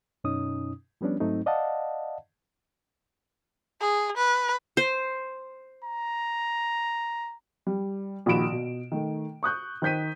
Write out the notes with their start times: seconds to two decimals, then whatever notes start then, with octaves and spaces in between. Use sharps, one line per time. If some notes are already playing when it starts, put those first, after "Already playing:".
0.24 F#2 B2 C#4 D#4 D#6
1.01 F3 G3 B3 C#4 D4
1.20 G#2 F#3 A3 C4 D#4
1.46 D5 D#5 F5 F#5 A5
3.81 G#4
4.17 B4
4.77 C5
5.84 A#5
7.67 G3
8.26 A#1 D#3 F#4 B5 D7 E7
8.52 B2
8.92 D#3 A3
9.43 C#6 D#6 F#6 G6
9.82 D#3 C5 G6 B6 D#7